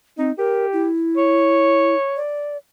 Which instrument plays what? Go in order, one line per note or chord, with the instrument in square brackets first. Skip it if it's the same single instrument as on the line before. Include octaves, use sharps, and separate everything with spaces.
[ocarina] C4 [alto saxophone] D#4
[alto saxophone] G4 [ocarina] A#4
[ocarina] E4
[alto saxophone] C#5
[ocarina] D5